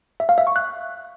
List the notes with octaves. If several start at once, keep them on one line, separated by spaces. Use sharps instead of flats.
E5
F5
E5
C#6
F#6